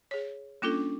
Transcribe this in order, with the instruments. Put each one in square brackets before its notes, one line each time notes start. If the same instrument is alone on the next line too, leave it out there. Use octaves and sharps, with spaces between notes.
[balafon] G#4 C#5
[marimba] G3 C#4 D4 [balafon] A#3 F4 A4